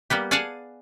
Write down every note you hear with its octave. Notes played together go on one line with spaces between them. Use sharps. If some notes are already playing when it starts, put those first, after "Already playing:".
G3 A#3 B3 G4
G#4 D5 F5 F#5 G#5 A5